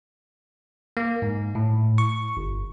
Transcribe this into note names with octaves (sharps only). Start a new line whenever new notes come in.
A#3
G#2
A2
C#6
G1